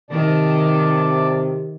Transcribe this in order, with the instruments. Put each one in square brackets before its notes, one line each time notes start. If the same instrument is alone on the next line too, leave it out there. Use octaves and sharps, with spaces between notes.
[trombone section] C3 [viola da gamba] D#3 [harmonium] D5 A5